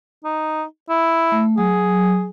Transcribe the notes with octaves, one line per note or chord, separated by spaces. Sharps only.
D#4
E4
A3
F#3 G#4